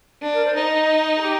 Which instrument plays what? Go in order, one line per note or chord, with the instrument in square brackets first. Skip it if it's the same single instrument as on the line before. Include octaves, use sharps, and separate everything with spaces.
[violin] D4
[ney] A#4
C5
[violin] D#4 [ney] D#5
[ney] G#4
G4